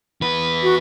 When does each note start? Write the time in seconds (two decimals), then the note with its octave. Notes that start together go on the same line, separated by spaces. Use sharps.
0.21 E2 B4
0.63 F#4